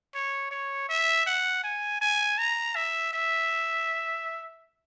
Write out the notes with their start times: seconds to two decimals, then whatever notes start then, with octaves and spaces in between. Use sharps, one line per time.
0.15 C#5
0.51 C#5
0.89 E5
1.27 F#5
1.64 G#5
2.01 G#5
2.39 A#5
2.76 E5
3.13 E5